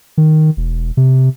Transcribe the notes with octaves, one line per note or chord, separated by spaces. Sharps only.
D#3
E1
C3